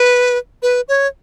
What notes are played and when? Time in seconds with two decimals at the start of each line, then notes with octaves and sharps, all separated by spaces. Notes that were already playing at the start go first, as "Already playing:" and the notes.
Already playing: B4
0.62 B4
0.88 C#5